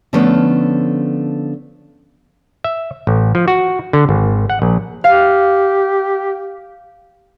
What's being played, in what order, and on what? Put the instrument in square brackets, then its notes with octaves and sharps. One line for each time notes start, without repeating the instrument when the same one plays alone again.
[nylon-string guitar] D3 F3 A3 B3 C#4
[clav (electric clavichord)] E5
A1
F3
F#4
D3
G#1
F#5
A#1
[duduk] G4 [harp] F5